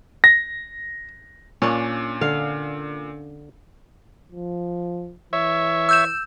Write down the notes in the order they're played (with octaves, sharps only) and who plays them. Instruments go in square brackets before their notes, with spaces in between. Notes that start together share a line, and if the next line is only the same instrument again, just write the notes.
[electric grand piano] A#6
[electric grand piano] A#2 [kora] C#4 D4
[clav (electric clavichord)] D3 [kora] F5
[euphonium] F3
[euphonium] E3 [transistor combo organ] C#5 E5
[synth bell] E6 G6 E7